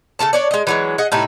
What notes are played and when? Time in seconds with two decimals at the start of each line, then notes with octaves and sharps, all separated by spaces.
0.19 C#3 D4 A4 A5
0.33 D4 C#5 D5
0.51 G#3 D#5
0.67 E3 F#3 G#3
0.98 G#4 D#5 F#5
1.12 A2 C3 D#4 E4